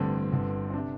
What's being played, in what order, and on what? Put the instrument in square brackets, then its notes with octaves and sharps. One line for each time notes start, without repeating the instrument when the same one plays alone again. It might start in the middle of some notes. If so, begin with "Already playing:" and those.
Already playing: [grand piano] A1 G2 D3 C4
G1 G2 D3
C4
C3 D4